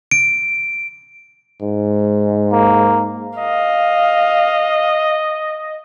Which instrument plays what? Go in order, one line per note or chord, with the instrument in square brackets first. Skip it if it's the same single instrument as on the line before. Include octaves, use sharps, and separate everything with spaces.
[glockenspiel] D7
[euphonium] G#2
[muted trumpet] A#3
[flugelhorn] D#5 [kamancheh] F5